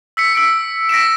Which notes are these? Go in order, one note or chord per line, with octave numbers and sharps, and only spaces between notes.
E6 B6 C#7
E6 B6 C#7 D7
A#6 B6 D7 E7